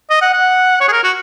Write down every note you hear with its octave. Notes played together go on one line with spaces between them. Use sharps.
D#5
F#5
F#5
C#5
G#4
A#4
F#4